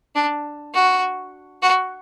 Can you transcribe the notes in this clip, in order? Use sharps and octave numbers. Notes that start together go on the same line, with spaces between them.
D4
F#4
F#4